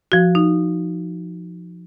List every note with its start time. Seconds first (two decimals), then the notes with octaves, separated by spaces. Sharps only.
0.12 F3 F#4
0.35 D#4